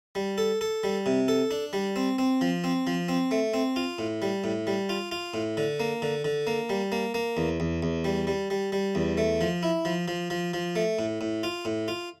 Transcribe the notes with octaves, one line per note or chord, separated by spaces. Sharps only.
G3
A4
A4
G3
C3
A4
D4
G3
C4
C4
F3
C4
F3
C4
A3
C4
F4
A2
G3
A2
G3
F4
F4
A2
D3
A#3
D3
D3
A#3
G3
A#3
A#3
E2
E2
E2
G3
G3
G3
G3
E2
A3
F3
E4
F3
F3
F3
F3
A3
A2
A2
F4
A2
F4